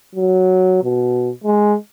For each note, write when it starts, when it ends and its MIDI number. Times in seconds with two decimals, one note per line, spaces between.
0.15 0.83 54
0.84 1.30 47
1.44 1.75 56